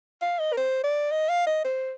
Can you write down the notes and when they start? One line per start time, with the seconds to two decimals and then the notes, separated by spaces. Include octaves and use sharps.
0.22 F5
0.39 D#5
0.53 A#4
0.57 C5
0.84 D5
1.11 D#5
1.29 F5
1.46 D#5
1.64 C5